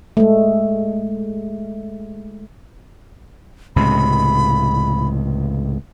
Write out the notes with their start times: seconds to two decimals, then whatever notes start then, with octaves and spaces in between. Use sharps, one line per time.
0.17 G#3 A3
3.76 C#2 A2 C3 B5